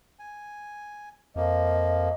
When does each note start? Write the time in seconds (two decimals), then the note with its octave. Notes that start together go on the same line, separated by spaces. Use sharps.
0.19 G#5
1.36 F2 F3 A#3 D#5